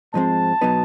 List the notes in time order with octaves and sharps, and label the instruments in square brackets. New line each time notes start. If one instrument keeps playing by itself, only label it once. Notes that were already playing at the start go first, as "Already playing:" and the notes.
[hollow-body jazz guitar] G#2 F3 G#3 C4 [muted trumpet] A5
[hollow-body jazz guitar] B2 F#3 B3 D#4